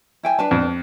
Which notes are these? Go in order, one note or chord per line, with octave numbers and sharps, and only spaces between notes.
E4 G5 G#5
D4 B4 A5
F2